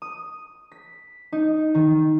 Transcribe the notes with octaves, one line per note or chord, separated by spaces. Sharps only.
D#6
B6
D#4
D#3